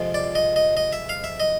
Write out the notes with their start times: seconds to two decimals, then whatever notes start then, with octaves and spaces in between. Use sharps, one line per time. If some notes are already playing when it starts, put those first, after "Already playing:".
Already playing: F2 C3 F3 G#3
0.14 D5
0.35 D#5
0.56 D#5
0.77 D#5
0.93 E5
1.09 F5
1.24 E5
1.40 D#5